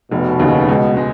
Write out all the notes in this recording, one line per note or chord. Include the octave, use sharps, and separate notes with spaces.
F1 B2
D#2 C#3
C#2
G#3